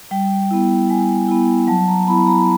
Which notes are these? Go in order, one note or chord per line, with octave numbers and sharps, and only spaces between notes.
G3 G5
B3 E4
G3 G#5
B3 E4
F#3 A5
A#5
B3 E4 B5
A#5